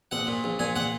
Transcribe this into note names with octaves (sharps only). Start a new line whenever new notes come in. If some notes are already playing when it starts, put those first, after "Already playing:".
A#1 F#5
A#2
A#1
A#2 G#5
A#2 F#5